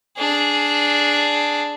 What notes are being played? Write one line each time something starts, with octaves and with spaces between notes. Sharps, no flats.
D4 G#4